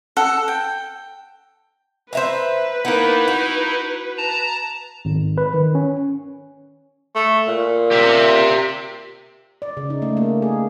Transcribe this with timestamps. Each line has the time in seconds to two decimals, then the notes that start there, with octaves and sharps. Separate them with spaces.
0.17 A4 F#5
0.48 G5
2.13 B4 C5 E5 A#5
2.85 A#3 B3 D#4 E4
3.28 F#4
4.18 A5 A#5
5.05 G#1
5.38 B4
5.54 D#3
5.75 C#4
7.15 A3
7.47 A#2
7.92 G4 E5
9.62 D5
9.77 C#3
9.90 D#4
10.02 A3
10.17 A#3
10.42 G#4